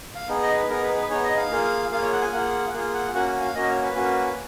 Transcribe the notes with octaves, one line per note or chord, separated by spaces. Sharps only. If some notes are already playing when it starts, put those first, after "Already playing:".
F5
B3 D#4 G#4
D#5
B4
B3 D#4 G#4 A#4
B4
B4
B3 D#4 G#4 C#5
D#5
F5
A#3 F4 G#4
A#3 F4 G#4 F5
C#5
F#5
G#5
A#3 F4 G#4 F#5
A#3 F4 G#4
F#5
A#3 C#4 F#4 F#5
G#5
F5
A#3 C#4 F#4 D#5
C#5
B4
A#3 C#4 F#4